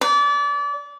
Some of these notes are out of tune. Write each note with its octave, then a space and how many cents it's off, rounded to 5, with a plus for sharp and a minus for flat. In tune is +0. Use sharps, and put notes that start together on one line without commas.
D5 -30